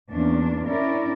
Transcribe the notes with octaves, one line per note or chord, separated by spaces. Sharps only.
E2 A#3 C#4 D4
C#4 D4 E4 A#4 D5